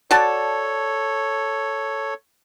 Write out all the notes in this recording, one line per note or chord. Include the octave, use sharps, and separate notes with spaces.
F#4 A4 C#5 D5 A5